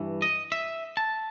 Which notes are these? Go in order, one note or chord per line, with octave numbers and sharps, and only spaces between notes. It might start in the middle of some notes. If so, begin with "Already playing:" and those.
Already playing: G2 E3
D#5
E5
A5